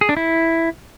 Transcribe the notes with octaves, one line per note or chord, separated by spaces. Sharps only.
G#4
D4
E4